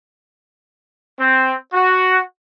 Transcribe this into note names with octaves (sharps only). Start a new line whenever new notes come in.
C4
F#4